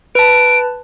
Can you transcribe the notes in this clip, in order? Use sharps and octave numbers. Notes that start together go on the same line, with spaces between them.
B4 A5 D7